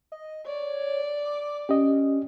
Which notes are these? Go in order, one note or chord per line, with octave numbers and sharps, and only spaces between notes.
D#5
C#5 D5
D6
C#4 G4 D#5